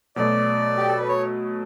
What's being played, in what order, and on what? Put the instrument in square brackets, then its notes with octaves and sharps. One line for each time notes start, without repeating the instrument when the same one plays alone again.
[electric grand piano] B2 F#3 A3 [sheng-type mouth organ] D5
[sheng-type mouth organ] G4
A4
B4
C#5